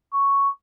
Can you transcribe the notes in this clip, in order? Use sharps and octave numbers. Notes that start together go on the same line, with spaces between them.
C#6